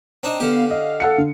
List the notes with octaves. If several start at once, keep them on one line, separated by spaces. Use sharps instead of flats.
C4 D4 D#4
D3 B3 G4 F5
D#5 F5
A4 F#5 C#7
D3